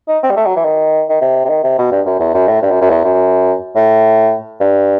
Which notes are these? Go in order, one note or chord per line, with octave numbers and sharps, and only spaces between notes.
D#4
C4
G3
A3
F#3
E3
D#3
D#3
C3
C3
D#3
C3
B2
G2
F#2
E2
F#2
A2
G2
F#2
F#2
E2
F#2
A2
G2